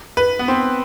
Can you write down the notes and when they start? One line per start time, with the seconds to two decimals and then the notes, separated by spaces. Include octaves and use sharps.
0.17 B4
0.39 B3
0.48 C4